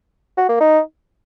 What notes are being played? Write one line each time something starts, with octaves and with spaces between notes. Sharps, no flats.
F#4
A#3
D#4